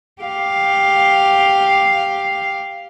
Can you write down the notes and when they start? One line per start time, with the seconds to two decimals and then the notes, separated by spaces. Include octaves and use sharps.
0.22 G4 F5